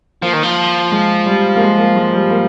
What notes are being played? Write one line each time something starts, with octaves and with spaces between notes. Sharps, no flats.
F3 A#3
D#3
F3
G#3
G3
A#3
G#3
A#3
G#3
G3
A#3